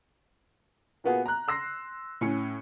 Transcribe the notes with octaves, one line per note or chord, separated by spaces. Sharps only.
A#2 A#3 B3 F#4 G#4
A#5 F#6
C6 E6 A#6 C7
A2 C#4 C#7